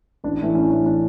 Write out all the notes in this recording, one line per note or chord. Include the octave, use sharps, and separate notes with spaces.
A1 D4
A2 E3 A3
A1 C#4
A2 E3 A3 D4
D4